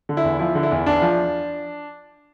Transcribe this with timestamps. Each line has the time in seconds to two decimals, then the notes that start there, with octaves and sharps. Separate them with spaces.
0.09 D3
0.17 E4
0.25 E2
0.39 F3 E4
0.55 D3
0.63 E4
0.72 E2
0.86 E2 D4
1.02 F3